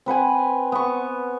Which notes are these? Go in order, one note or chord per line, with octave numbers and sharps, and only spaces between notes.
C4 B4 F#5 G#5
B3 C#6